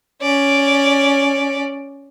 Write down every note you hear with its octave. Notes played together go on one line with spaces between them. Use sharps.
C#4 D5